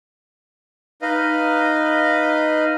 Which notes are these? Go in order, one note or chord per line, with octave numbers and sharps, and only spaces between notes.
D#4 B4 D#5 F5